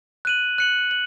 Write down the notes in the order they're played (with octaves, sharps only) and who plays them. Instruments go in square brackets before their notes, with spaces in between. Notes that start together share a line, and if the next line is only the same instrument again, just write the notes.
[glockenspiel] F#6 D#7 F#7
F#6 C#7 F#7
F#7